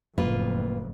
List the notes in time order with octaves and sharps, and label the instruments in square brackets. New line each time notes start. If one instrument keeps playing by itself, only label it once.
[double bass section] F#1 F2 A2 [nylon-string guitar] A#3 F4 B4